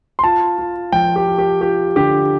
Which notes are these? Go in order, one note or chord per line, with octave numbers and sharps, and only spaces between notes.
C6
F4 A5
F4
F3 G5
G4
F4
G4
F4 G4
D3 G4